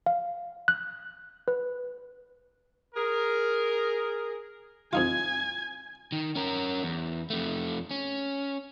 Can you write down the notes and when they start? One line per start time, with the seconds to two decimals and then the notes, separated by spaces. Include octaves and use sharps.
0.06 F5
0.68 F#6
1.48 B4
2.95 G#4 A#4
4.93 F2 D#4 F4 G#5 G#6
6.12 D#3
6.36 C#4 A#4
6.83 E2
7.30 F2 A3
7.91 C#4